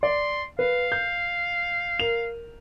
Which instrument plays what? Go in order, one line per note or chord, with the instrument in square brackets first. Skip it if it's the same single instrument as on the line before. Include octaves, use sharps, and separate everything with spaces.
[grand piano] D5 [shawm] C6
[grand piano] B4 [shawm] F5
[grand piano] G6
A#4 F7